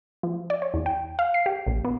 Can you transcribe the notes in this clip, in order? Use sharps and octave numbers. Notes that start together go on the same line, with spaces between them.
F3
D5
C#5
E2
G5
F5
C7
G4
A#1
B3